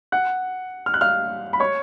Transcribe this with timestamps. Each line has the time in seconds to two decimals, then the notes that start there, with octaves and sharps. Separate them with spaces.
0.12 F#5 F#6
0.86 F6
0.94 F#6
1.01 F5 F6
1.53 B5
1.60 C#5 C#6